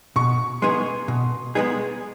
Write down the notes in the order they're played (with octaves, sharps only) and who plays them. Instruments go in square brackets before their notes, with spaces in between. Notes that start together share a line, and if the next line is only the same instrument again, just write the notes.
[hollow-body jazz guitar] B2 [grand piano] C#6
[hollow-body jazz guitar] G#3 B3 D#4 G#4 [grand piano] C6
[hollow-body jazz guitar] B2
G#3 B3 D#4 G#4